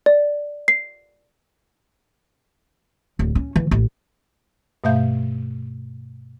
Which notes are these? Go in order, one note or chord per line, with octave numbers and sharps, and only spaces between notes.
D5
C7
D1
C#4
E3
A1
G2 B2 A3 E5 F5 G6